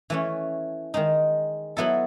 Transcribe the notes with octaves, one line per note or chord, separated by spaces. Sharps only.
E3 A3 C#4
D#3 G#3 D#4
F#3 B3 E4 A4